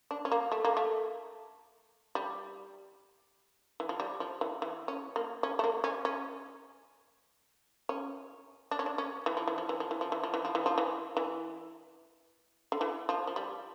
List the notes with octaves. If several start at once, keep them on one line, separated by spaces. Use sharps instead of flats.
D4
C#4
A#3
A3
A#3
A3
G3
E3
F3
G3
F3
E3
E3
C#4
A#3
C#4
A3
A#3
C#4
C#4
C#4
D4
C#4
D4
C#4
E3
F3
E3
F3
E3
F3
E3
F3
E3
F3
E3
F3
E3
F3
E3
E3
D3
E3
F3
F3
G3